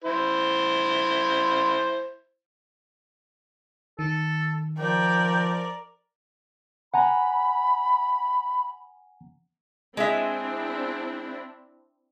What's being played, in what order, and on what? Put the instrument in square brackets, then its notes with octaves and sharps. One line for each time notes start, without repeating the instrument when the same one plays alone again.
[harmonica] E4 C5
[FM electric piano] D#3 [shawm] A4
[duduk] F3 [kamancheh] A#4 D5 [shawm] G5
[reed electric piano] F#5 G#5 A#5 [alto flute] B5
[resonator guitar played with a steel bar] G#3 G#4 E5 [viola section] C4 D4 E4